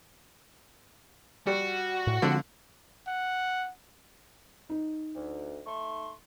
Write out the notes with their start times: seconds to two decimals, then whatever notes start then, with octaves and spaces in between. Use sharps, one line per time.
1.47 G3 F#4
2.07 A2
2.22 D3 F3 G#3 C4
3.07 F#5
4.69 D#4
5.15 D2
5.66 A3 C6 C#6